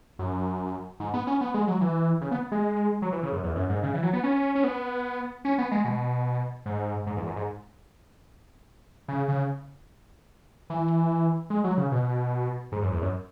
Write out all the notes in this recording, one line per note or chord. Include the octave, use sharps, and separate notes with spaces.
F#2
G#2
B3
C#4
B3
G#3
F#3
E3
C#3
B3
G#3
F#3
E3
C#3
F#2
E2
F#2
G#2
C#3
E3
F#3
B3
C#4
C#4
B3
C#4
B3
G#3
B2
G#2
G#2
E2
F#2
G#2
C#3
C#3
E3
G#3
F#3
C#3
B2
G#2
F#2
E2
F#2